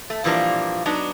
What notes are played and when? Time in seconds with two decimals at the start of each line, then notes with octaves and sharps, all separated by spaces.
0.10 A3
0.24 A#2 E3 F3 G3 A#3 D4
0.86 F#3 B3 D4 D#4